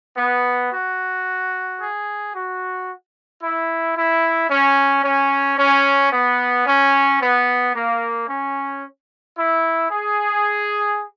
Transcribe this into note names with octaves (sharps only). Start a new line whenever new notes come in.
B3
F#4
G#4
F#4
E4
E4
C#4
C#4
C#4
B3
C#4
B3
A#3
C#4
E4
G#4